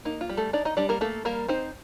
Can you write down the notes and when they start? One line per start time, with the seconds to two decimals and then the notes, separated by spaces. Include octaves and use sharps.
0.05 A#3 D#4
0.21 F4
0.29 G3
0.37 A3 A4
0.53 D4 D#4 D5
0.65 D#4 D#5
0.77 G3 D4 D5
0.89 A#3 A#4
1.01 A3 A#3 A4
1.25 G3 A#3 A#4
1.48 C4 D#4 C5